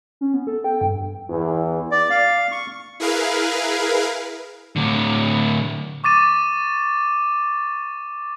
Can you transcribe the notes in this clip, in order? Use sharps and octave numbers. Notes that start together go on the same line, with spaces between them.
C#4
B3
A4
G5
G2
E2
D5
F5
C#6
E4 G#4 A#4 B4 F5
A2 D3
C#6 D6 A6 D#7